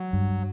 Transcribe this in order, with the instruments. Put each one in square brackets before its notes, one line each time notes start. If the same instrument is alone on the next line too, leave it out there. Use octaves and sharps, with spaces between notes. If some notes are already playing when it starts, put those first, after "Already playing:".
Already playing: [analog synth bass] F#3
[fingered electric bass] G2